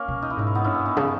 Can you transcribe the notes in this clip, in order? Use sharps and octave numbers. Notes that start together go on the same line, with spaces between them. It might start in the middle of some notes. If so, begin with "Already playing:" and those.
Already playing: A#3 C#4
B2
D#4
E4
G#2 D#4
E4
B3 D#4
G2 C#4 E4
B3 D#4
C#3